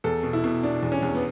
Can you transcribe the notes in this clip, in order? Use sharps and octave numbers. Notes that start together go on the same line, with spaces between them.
E2 A4
B2
E4
B2
B2 D4
E2
C#4
E2
B3